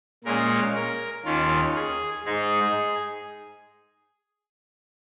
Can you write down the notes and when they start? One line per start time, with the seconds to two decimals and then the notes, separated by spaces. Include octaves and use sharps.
0.24 A#2 G#3 C#4 A#4
0.75 A#4
1.25 D#2 D#3 C#4 F4
1.75 G#4
2.25 G#2 G#3 D#4 G#4